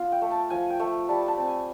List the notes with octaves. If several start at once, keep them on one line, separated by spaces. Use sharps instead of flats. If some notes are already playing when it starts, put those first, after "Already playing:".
Already playing: B3 F4
G5
A3
A5
F3 G#5
G5
A3
G3 A5
A5
C4
G#5